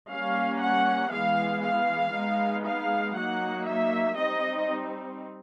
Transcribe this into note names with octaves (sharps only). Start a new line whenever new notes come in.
G3 A#3 C#4 F5
F#5
E3 G#3 B3 F5
F5
G#3 B3 D#4
F5
F#3 A#3 D#4 F#5
E5
G3 C4 D#4 D#5